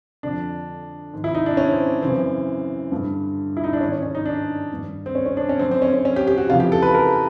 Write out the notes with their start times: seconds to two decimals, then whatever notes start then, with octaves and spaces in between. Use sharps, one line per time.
0.23 F2 D3 D4
1.13 G#2 D#3
1.24 E4
1.35 D#4
1.46 D4
1.57 C#4
1.72 C4
2.02 F#2 C#3 E3 C4
2.92 G2 D3
3.57 E4
3.64 D#4
3.73 D4
3.80 G#2 D#3 C#4
3.92 C#4
4.03 C#4
4.15 D#4
4.26 D4
4.70 G2 D#3
5.06 C4
5.15 C#4
5.26 C#4
5.37 D4
5.49 C#4
5.59 F#2 D3 C4
5.71 C4
5.82 C#4
5.93 C#4
6.05 C#4
6.16 G4
6.27 G4
6.38 F#4
6.49 F2 C#3 E3 F4
6.60 G4
6.72 A4
6.82 B4
6.95 A#4